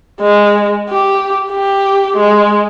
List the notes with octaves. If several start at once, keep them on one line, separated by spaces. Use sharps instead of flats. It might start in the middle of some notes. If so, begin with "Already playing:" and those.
G#3
G4
G4
G#3